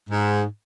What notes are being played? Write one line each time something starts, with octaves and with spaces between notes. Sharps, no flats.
G#2